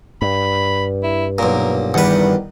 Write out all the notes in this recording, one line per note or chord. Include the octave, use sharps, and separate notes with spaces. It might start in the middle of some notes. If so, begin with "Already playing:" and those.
G2 B5
E4
B1 A#2 A#4
E2 D#3 G3 B4 F#5